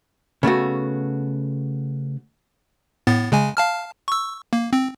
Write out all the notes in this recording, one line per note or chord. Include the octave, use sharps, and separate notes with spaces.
C#3 A3 B3 F#4
A2 B3 A6
C#3 G#3 G#5
F5 A5 F6
C#6 E6
A#3
C4